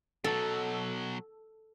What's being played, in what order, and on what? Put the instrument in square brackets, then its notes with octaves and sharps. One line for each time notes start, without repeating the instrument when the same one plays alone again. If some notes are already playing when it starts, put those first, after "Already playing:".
[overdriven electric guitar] B2 F#3 [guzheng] A4